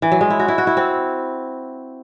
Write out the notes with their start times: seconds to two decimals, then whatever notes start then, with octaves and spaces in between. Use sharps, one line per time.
0.02 E3
0.12 F#3
0.21 G#3
0.30 E4
0.39 F#4
0.48 E4
0.58 F#4
0.67 E4
0.77 C4